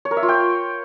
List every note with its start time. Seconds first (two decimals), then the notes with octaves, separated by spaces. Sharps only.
0.05 C#5
0.11 A#4
0.17 E5
0.23 F4
0.29 G5